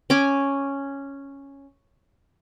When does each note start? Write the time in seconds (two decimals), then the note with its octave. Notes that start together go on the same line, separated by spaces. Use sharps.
0.10 C#4 G#5 D6